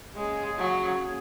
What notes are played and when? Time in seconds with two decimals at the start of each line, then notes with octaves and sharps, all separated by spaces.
0.15 C#3 G#3 A#3 C#4 G#4
0.58 F#3
1.00 C#3 A#3 C#4 G#4